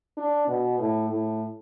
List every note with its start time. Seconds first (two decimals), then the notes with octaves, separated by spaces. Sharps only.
0.17 D4
0.48 B2
0.79 A2
1.10 A2